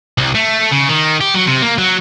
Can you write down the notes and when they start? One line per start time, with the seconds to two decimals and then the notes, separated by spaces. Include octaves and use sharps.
0.18 C2
0.35 A3
0.72 C#3
0.89 D#3
1.21 G4
1.34 F#3
1.47 C3
1.62 A#3
1.78 F#3